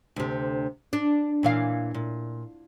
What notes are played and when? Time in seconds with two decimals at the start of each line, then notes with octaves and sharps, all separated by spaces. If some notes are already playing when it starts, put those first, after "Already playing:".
0.16 D2 C3
0.93 D4
1.43 A#2 E3 F5
1.94 A#2